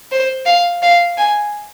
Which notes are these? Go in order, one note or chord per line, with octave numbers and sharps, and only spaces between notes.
C5
F5
F5
G#5